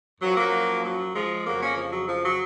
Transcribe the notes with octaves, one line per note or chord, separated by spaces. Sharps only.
F#2 F3 F#3
F#3 A#3
F#3
F3 G#3
F2 C#3 F3 F#3 A#3
A#3 C#4
F3
F#3
F3
F#3